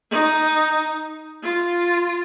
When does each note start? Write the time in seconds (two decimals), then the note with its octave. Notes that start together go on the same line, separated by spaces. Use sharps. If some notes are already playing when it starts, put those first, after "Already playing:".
0.11 D#4
1.43 F4